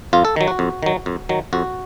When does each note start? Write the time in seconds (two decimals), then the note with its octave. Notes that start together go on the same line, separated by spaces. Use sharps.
0.13 F2 F4
0.25 A4
0.36 D#3 F#3
0.48 F#4
0.59 F2
0.83 D#3 F#3
1.06 F2
1.29 D#3 F#3
1.53 F2 F#4